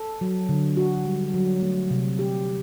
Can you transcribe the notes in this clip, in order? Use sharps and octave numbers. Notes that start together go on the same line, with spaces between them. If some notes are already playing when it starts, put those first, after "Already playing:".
Already playing: A4
F#3
D3
F#4
G3
F#3
A3
C3
G4